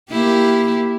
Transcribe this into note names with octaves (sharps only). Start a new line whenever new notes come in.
A#3 E4 G4